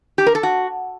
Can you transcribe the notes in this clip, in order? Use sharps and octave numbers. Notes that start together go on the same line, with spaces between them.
G4
A#4
A4
F#4